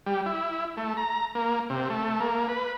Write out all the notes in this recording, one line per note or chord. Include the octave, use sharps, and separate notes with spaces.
G3
E4
A3
A#5
A#3
C3
A3
A#3
B4